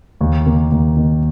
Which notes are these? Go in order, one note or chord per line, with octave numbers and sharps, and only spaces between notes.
D#2
D#3 A#3
D#2
D#3 A#3